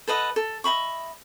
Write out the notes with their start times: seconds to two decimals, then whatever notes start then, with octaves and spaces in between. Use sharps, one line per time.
0.07 A4 B4 D#5 F#5
0.36 A4
0.64 D#5 E5 B5 C#6